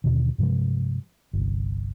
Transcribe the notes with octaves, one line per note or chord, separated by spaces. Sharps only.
D#2 B2 D3
G2 C3 F3 G#3
G1 C2